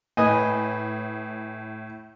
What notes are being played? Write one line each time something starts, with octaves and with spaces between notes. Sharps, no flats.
A2 B4 D#5 G#5